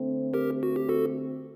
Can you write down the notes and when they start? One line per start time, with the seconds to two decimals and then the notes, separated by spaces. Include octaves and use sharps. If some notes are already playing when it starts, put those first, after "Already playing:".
Already playing: D3 A3 C4
0.34 G4 A#4
0.63 F#4
0.76 G4
0.89 F#4 A4